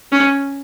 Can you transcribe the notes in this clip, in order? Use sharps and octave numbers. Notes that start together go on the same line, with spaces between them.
C#4